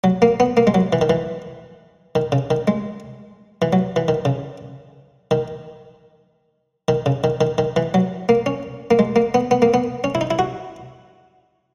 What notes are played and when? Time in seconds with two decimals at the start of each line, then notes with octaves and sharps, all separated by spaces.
0.04 F#3
0.22 A#3
0.40 B3
0.57 A#3
0.67 G#3
0.74 F#3
0.93 E3
1.01 D#3
1.10 E3
2.15 D#3
2.32 C#3
2.50 D#3
2.68 G#3
3.62 E3
3.73 F#3
3.96 E3
4.08 D#3
4.25 C#3
5.31 D#3
6.88 D#3
7.06 C#3
7.24 D#3
7.41 D#3
7.58 D#3
7.76 E3
7.94 F#3
8.29 A#3
8.46 C#4
8.91 A#3
8.99 G#3
9.16 A#3
9.34 B3
9.51 B3
9.62 A#3
9.74 B3
10.04 C#4
10.15 E4
10.21 D#4
10.31 E4
10.39 F#4